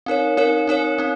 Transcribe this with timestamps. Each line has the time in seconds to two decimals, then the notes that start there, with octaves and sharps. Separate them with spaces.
0.06 C4 D#4 A#4 C#5
0.37 C4 D#4 A#4 C#5
0.67 C4 D#4 A#4 C#5
0.98 C4 D#4